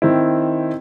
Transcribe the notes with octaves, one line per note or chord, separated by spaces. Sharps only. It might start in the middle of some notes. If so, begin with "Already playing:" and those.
D#3 C4 E4